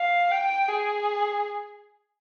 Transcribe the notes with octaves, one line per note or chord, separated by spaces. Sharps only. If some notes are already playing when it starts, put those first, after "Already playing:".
Already playing: F5
G5
G#4